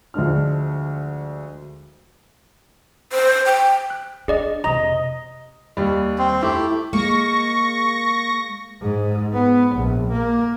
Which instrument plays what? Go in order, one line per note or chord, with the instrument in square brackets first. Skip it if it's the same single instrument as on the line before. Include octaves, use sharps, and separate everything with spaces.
[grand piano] D2 F3 G#3 D4 F6
[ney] C5
G5
[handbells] F#6
[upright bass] D4 [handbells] G#4 D5 D#5
[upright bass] F2 C3 [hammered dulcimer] D#5 [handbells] A#5
[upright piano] D#2 G3
[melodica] C4
[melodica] A3 G4 [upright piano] E4
[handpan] G#3 [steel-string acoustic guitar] A#3 [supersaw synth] C#6 A#6
[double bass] G#2
B3
A#1
A#3